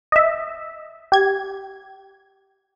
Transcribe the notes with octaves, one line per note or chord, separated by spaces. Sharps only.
D#5 E5
G4 G#6